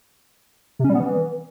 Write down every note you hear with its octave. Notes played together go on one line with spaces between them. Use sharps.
C3
C#4
G3
B3
E3